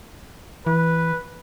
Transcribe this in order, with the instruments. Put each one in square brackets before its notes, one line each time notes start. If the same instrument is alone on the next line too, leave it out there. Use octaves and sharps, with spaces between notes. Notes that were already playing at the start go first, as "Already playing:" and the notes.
[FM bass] E3 [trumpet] B4